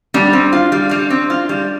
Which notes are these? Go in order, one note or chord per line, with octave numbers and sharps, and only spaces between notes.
G3 D4
C4
F4
G3
G3
C4
F4
G3